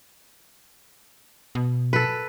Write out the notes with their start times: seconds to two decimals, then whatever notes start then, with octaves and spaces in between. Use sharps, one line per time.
1.55 B2
1.93 A4 B4